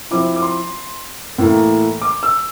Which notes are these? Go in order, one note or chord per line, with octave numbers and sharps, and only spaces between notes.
F3 C4 E4 D6
D6
C6
A2 E3 A#3
D6
E6